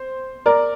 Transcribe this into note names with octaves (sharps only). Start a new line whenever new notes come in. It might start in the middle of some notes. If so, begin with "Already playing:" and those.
Already playing: C5
A#4 D5